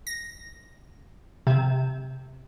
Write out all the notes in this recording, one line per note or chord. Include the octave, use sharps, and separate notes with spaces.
A#6
C3